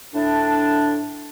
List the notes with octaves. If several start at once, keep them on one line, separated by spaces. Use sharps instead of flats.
A2 D4